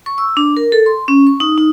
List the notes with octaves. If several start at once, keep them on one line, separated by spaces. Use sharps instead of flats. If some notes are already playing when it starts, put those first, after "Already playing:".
C#6
E6
D4
A#4
A4
C6
C#4
C#6
D#4
D#4